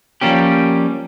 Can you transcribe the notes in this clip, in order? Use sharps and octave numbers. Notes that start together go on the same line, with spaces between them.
F3 G3 A#3 C#4 G4